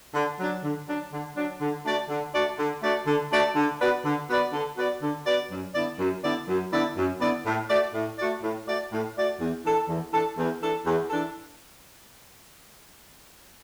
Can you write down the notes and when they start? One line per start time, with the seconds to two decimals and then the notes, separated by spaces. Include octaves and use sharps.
0.14 D3
0.40 F#3 D4
0.64 D3
0.87 F#3 D4
1.12 D3
1.36 F#3 D4
1.60 D3
1.85 A3 D4 F#4 D5
2.09 D3
2.34 A3 D4 F#4 D5
2.59 D3
2.82 A3 D4 F#4 D5
3.06 D3
3.31 A3 D4 F#4 D5
3.56 D3
3.80 B3 F#4 B4 D5
4.04 D3
4.29 B3 F#4 B4 D5
4.53 D3
4.77 B3 F#4 B4 D5
5.02 D3
5.26 B3 F#4 B4 D5
5.51 F#2
5.75 D3 B3 E4 D5
5.99 F#2
6.24 D3 B3 E4 D5
6.48 F#2
6.72 D3 B3 E4 D5
6.97 F#2
7.21 D3 B3 E4 D5
7.45 A2
7.69 A3 F#4 D5
7.94 A2
8.18 A3 F#4 D5
8.42 A2
8.67 A3 F#4 D5
8.91 A2
9.16 A3 F#4 D5
9.40 E2
9.65 E3 D4 A4
9.88 E2
10.13 E3 D4 A4
10.38 E2
10.62 E3 D4 A4
10.86 E2
11.10 E3 D4 A4